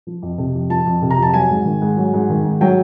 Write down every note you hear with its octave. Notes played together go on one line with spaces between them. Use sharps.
F3
F2
C3
F2
F3 A5
F2
C3
A#5
F2 A5
F#3 G#5
G#2
D#3
G#2
F#3
G#2
D#3
G#2
F#3 G5